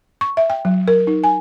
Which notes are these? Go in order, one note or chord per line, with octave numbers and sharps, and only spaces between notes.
C#6
E5
G5
F#3
A#4
D#4
G#5